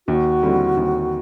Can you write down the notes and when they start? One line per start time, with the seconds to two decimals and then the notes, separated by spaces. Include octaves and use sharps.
0.08 D#2 F#4
0.43 D3 G3 C4 E4
0.77 D#2